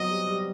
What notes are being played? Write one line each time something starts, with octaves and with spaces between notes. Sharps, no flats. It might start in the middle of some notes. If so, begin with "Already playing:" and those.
Already playing: F#3 B3 C4 D#5
G3
G3